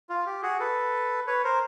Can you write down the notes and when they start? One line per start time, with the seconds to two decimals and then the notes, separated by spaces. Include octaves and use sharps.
0.09 F4
0.26 G4
0.42 F#4 G#4
0.59 A4 B4
1.27 B4 C#5
1.44 A#4 C5